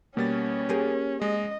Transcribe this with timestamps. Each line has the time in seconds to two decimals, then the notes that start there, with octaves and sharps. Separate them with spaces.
0.17 B2 G3 A#3 C#4 A6
0.69 G4 G#4 A#4
1.22 G#3 D#5